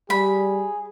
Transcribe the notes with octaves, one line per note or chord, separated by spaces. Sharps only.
G3 G#4 B5